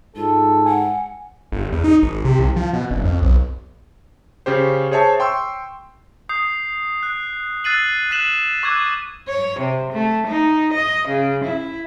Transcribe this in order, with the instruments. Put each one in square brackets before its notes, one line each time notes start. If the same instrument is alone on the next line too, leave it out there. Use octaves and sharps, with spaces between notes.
[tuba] G#2 [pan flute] F4 [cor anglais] A4
[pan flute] F#5 [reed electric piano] G#5
[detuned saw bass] G1
E2
D#4
G#1
C3
C2
F3
B2
F#1
F2
B1
[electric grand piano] C#3 C#4 G4 C5
G#4 C5 C#5 E5 A5
G5 C6 C#6 E6
[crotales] D#6 G6 C7
F#6
E6 F#6 A6 C7 D#7 F#7
F#6 B6 E7 F#7
C#6 D6 E6 F#6 G#6
[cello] C#5
C3
A3
D#4
D#5
C#3
E4